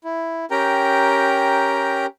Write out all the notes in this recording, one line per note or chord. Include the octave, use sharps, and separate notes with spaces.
E4
C#4 G4 A#4 G5 A#5